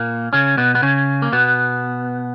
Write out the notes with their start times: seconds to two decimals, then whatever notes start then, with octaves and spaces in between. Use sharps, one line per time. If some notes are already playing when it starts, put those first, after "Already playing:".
Already playing: A#2 A#3
0.33 C#3 C#4
0.57 B2 B3
0.75 B3
0.82 C#3 C#4
1.22 A#3
1.33 B2 B3